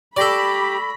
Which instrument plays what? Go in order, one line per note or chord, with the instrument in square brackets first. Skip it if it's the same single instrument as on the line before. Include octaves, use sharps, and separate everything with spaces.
[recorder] G4 [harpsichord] A4 D5 [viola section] B5 [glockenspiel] C#6 A#6 B6